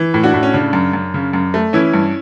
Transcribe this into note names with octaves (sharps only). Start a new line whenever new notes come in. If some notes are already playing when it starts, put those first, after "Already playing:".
Already playing: E3
A2
D4 F#4
A2
C#4
C#3 D4
F#2
F#2
C#3
F#2
A3
E3 C#4 E4
G2